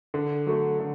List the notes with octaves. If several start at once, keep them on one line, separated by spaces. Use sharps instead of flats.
D3
F#3 A3
D3